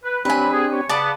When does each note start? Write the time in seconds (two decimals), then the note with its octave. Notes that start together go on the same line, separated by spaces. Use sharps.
0.04 B4
0.25 F#3 C4 D4 G4 B4 G#5 B5
0.53 G#4
0.72 C#5
0.89 C#3 B3 D5 A5